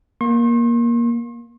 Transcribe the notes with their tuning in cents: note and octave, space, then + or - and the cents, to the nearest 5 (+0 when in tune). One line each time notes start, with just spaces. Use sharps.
A#3 +15 C6 +45